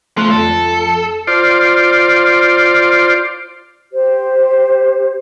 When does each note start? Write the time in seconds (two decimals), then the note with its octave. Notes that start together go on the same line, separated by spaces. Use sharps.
0.17 F3 A3 C6 F#6
0.31 F2 A4
1.27 F4 C5 D5
3.92 G4 C5